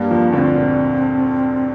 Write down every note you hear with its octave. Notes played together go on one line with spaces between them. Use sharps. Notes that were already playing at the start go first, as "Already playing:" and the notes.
Already playing: G2 G3 A#3
F2 F3
D2 D3 C4
A#2